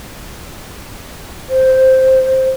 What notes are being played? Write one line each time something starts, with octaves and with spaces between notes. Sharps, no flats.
C5